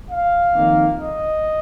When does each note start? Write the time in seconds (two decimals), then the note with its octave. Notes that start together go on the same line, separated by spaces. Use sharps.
0.10 F5
0.55 F2 D#3 A#3
1.00 D#5